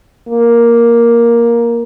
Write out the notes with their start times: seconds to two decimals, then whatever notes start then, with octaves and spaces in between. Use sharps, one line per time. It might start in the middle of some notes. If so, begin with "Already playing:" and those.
0.28 A#3